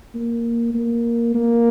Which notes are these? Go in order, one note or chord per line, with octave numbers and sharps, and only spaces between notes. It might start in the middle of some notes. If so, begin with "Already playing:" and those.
A#3
A#3
A#3